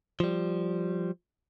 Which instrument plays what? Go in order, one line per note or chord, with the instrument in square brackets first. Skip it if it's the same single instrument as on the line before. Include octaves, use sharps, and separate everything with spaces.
[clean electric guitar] F3 G3